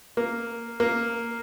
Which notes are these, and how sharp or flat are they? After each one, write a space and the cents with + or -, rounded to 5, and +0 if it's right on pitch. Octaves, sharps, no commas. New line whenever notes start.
A#3 -5
A#3 -5